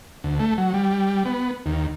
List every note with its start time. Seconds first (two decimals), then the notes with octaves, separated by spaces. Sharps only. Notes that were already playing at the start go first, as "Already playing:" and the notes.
0.24 D2
0.39 A3
0.58 F#3
0.74 G3
1.25 B3
1.66 D#2